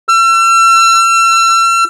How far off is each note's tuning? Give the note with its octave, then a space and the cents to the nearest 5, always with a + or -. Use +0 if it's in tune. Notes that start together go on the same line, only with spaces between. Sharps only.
E6 +40